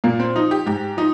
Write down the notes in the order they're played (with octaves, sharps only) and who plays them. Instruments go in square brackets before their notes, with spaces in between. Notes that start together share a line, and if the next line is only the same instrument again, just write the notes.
[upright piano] A#2 A#3
C4
F3 D#4
G4
G#2 G4
F3 D#4